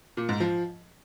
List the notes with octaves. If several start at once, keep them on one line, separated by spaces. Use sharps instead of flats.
A#2
G#2
F3